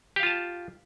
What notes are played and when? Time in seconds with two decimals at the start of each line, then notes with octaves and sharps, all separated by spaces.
0.16 G4
0.20 F5
0.23 F4
0.26 A5